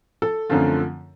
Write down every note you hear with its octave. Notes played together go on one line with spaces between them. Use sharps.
A4
F#2 D3 F3 A3 C4 F4